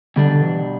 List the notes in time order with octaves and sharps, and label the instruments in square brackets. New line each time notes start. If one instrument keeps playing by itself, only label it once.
[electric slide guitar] B2 G3 D4 [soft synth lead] D3
[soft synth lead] D3
E3